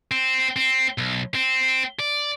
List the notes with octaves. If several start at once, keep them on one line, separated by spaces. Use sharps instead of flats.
C4
C4
B1
C4
D5